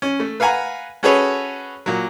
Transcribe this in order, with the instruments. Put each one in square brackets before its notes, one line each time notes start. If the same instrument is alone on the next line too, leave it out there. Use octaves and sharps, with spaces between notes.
[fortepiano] C#4
A3
B4 F5 F#5 G#5 A#5
C#4 F#4 G#4 A4 B4 C#5
A#2 F#3